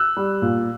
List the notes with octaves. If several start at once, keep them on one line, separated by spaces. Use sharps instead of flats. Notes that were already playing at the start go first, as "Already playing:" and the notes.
Already playing: E6 F#6
G3
A#2